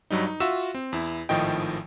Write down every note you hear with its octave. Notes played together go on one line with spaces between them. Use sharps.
G2 F#3 G3 D#4
D#4
F4 F#4 E5 E6 E7
C4
E2 E4
G#1 A2 D#3 F3 D#5 G5